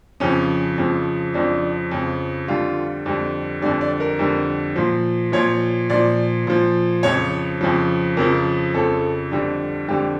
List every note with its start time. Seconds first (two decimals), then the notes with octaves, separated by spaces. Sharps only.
0.20 F2 C#3 F3 C#4
0.78 F2 C#3 F3
1.34 F2 C#3 F3 D4
1.91 F2 C#3 F3
2.48 F2 D3 G3 F4
3.06 F2 D3 G3
3.62 F2 D3 G3 D5
3.81 D5
4.00 A#4
4.19 F2 D3 G3
4.76 A#2 F3
5.32 A#2 F3 C#5
5.90 A#2 F3 D5
6.47 A#2 F3
7.03 F2 C#3 F3 C#5
7.61 F2 C#3 F3
8.17 F2 C#3 F3 A#4
8.74 F2 C#3 F3 A4
9.31 F2 D3 G3
9.88 F2 D3 G3 G4